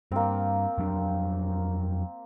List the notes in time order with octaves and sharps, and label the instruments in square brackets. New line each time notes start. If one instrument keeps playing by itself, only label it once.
[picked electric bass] G2 [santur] A#3 C4
[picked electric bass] F2 F#3 D4